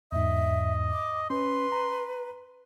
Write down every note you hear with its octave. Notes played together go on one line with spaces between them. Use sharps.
E2 G#2 D#5 E5
D6
C#4 B4 C6
A#5